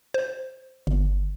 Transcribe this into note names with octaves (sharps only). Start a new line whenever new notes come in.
C5
G1